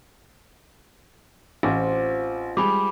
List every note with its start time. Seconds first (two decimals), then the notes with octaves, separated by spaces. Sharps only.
1.63 A1 C4 F4 D6
2.57 G3 G#3 B5 D6